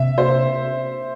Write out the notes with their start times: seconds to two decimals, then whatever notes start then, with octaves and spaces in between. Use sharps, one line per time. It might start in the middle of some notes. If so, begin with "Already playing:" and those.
Already playing: C3 E5
0.18 C5